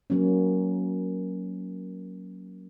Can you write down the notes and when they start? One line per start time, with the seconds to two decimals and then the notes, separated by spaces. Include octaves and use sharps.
0.10 F#3 A#3 C#4